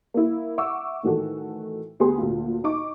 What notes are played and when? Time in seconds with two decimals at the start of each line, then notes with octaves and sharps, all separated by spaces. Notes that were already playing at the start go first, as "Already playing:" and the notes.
0.14 A#3 E4
0.58 E5 F#5 C#6 D6 E6
1.03 A2 D#3 E3 F#4 A4
2.00 D2 B3 G4 G#4 C6
2.18 D2 A#2
2.64 D#4 C#6 D6